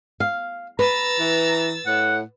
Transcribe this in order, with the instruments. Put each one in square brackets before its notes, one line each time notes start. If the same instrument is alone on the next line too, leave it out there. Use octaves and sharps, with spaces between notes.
[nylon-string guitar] F5
[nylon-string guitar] B4 [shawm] A#5 [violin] E6 A6
[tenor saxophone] E3
[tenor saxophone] A2 [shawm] F#5